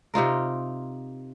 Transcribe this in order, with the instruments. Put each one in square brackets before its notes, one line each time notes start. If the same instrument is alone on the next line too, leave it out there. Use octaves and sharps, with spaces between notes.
[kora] C3 D#4 F4 A#4